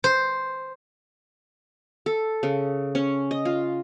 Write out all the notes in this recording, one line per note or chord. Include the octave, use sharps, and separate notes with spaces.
C5
A4
C#3
C#4
D#5
F4